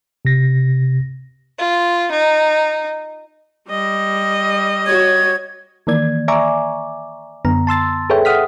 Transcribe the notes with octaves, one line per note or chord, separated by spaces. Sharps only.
C3 A#6
F4
D#4
G3 D#5
F#4 C#5 G#6
D#3 E3 A#3 D5 G#6
D5 E5 G#5 A#5 C#6 D6
F#2 D3 B3 A#5
A5 C6 E6 A6
G#4 A4 B4 C#5 E5 G5
E5 F#5 D#6 F6 B6